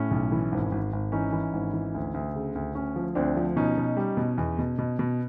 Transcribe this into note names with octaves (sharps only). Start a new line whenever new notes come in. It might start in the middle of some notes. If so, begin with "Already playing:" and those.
Already playing: A2 C#4
B1
E3
G#1
G#1
G#1
E3 C#4 D#4
E3
G#1
E3
D2
D2
C#3
D2
D2 C#4
F3
D2 C4 D4
F3
B2 C#4 D#4
B2
G3
B2
E2
B2
B2
B2